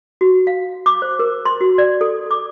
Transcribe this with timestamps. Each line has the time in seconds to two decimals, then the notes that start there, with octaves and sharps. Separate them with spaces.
0.21 F#4
0.47 F5
0.86 D6
1.02 C5
1.19 A#4
1.45 C6
1.61 F#4
1.78 D5
2.01 A4
2.31 D6